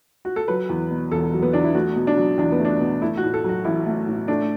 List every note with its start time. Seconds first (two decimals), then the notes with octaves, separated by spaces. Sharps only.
0.25 F#4
0.36 A4
0.48 F#3 B4
0.69 E2
0.91 B2
1.11 E1 A4
1.33 F#3
1.43 B3
1.53 E2 D4
1.64 E4
1.75 A3 F#4
1.96 B2
2.07 D4
2.17 F#3
2.38 E2 D4
2.52 B3
2.59 A3
2.65 D4
2.80 B2
3.02 A3 E4
3.17 F#4
3.23 A2
3.34 A4
3.44 F#3 F#4
3.65 A1 E4
3.86 A3
4.07 A2
4.28 A3 D4